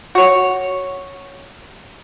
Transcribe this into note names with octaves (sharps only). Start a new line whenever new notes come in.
F#4 C#5